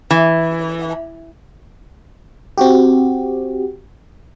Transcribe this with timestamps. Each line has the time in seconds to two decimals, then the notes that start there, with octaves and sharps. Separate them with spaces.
0.11 E3
2.58 C4 F#4 G4